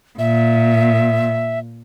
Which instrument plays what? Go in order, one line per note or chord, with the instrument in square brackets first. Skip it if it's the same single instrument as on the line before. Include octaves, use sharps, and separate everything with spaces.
[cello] A#2 [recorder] E5